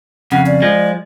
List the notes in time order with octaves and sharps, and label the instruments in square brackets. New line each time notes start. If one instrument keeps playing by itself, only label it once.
[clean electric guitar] F2 C#3 [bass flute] F#5
[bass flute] D5
[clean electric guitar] F3 G#3